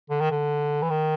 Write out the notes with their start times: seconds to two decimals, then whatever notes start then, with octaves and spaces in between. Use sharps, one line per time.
0.10 D3
0.20 D#3
0.31 D3
0.82 E3
0.90 D#3